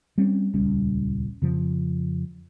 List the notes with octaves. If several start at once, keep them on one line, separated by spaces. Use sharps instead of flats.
G3 C4 C#4
D#1 C#2 G3 C#4
F2 C#3 F3